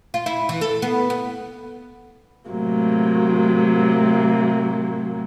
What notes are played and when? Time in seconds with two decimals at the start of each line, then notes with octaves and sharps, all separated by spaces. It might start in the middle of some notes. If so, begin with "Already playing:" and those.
0.14 F4
0.26 E4
0.49 E3
0.61 A4
0.82 B3
1.10 B3
2.50 A2 C3 F#3 A#3